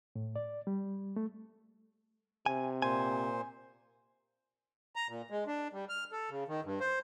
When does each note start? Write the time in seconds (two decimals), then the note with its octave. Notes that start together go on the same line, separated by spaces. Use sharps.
0.16 A2
0.36 D5
0.67 G3
1.16 A3
2.46 C3 G#5
2.82 A#2 C5 G#5
4.96 A#5
5.09 A#2
5.31 G#3
5.47 D4
5.73 G3
5.89 F6
6.12 A4
6.30 C#3
6.48 D#3
6.65 G2
6.80 C5